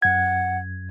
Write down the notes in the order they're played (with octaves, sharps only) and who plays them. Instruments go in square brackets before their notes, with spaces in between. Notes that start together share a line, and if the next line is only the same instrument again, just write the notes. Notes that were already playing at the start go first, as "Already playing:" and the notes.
[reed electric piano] F#2 G#6 [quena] F#5